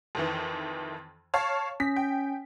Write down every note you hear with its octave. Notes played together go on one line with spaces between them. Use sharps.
F2 D#3 E3
C#5 F5 A5
C#4 B6
G5